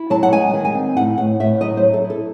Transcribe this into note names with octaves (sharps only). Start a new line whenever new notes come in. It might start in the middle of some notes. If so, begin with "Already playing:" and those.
Already playing: E4
F#3 A5
F#5
G#3 G#5
D#3
G#5
C4
A2 F#5
A2 F#5
A2 E5
F#3 D#5
C5
F#3
A4
E4
A4